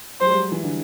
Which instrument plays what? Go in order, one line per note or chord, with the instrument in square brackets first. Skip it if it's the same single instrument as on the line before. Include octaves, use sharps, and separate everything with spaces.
[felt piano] F#3 [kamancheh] C5
[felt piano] G#3
G3
E3
D3